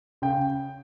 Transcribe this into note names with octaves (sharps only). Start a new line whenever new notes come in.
C#3 G5